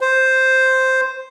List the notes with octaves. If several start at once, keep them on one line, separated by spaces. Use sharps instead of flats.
C5